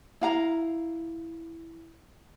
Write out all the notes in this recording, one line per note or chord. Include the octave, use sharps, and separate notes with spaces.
E4 F5 A#5